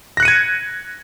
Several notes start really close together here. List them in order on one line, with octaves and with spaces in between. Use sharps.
A#6 F#6 C#7 D#7 G#6